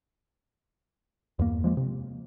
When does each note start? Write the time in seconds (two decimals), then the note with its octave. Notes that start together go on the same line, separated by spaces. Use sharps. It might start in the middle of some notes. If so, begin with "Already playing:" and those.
1.39 E2 G2 A#3
1.64 F3 G#3 A#3
1.77 C3